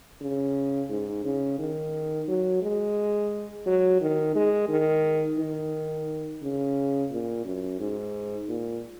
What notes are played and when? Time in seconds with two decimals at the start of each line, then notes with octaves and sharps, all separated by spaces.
0.21 C#3
0.90 G#2
1.24 C#3
1.59 D#3
2.28 F#3
2.62 G#3
3.67 F#3
4.01 D#3
4.36 G#3
4.69 D#3
5.39 D#3
6.42 C#3
7.11 A#2
7.45 F#2
7.80 G#2
8.49 A#2